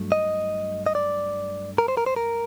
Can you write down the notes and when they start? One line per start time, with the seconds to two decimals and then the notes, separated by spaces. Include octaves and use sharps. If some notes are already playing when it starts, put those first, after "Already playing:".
Already playing: G2 F#3 A3
0.12 D#5
0.86 D#5
0.95 D5
1.78 A#4
1.88 C5
1.97 A#4
2.06 C5
2.16 A#4